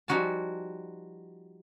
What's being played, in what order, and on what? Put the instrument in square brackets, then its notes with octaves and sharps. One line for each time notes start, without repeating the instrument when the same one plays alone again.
[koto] F3 G3 D#4 F#4 G#5 A5